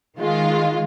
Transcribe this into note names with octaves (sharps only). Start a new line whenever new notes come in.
D#3 G#3 F4